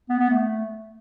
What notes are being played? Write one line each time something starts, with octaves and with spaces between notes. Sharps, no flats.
B3
B3
A3